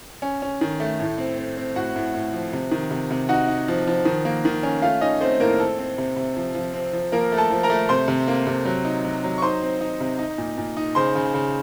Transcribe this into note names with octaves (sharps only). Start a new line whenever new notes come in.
C#4
C#4
D#3
A3
A2
C4
C4
C4
A2 F#4 F#5
A2
A2
F3
C3
D#3
C3
C3
D#4 F#4 F#5
D#4
F3
F3
D#3
A#3
D#3
C#4
A3 F4 F5
C#4 D#4 D#5
A3 C4 C5
A2 A#3 A#4
C4 A4
C4
C3
C3
F3
F3
C4
F3
F3 A#3 A#4
A3
A4 A5
F3
A#4 A#5
A3
C3 C5 C6
C3
A#3
C3
F#3
D#4
F#3
F#3
C#6
D#4 C5 C6
C4
D#4
C3
D#4
A#2
A#2
D#4
C#3 C5 C6
C#3
C#3